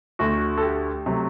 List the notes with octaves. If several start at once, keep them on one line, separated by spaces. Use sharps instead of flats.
D2 D3 A3 F#4
A4
G4
C3 F#3 A3